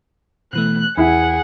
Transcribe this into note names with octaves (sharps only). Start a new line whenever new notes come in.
B2 E3 A3 F#6
E2 E4 G#4 F#5